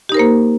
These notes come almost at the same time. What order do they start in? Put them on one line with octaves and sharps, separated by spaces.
G4 D#4 A#4 C5 A#3